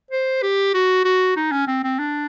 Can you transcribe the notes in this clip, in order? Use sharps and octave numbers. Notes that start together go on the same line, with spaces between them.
C5
G4
F#4
F#4
D#4
C#4
C4
C4
D4